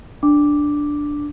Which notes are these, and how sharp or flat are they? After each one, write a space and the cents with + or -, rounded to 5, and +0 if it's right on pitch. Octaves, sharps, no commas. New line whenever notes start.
D4 +0 D6 +0